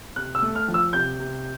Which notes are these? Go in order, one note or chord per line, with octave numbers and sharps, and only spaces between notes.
C3 F#6
E6
A3
F6
F3
E6
C3 G6
C3